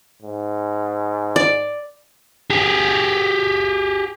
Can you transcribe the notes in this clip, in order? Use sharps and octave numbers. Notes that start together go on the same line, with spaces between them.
G#2
D5
G4 G#4